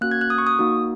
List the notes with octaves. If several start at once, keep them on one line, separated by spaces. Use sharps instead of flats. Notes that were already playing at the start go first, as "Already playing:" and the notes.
A#3 C#4 F#4 F#6
G#6
F#6
D#6
C#6
D#6
A#3 D#4 F#4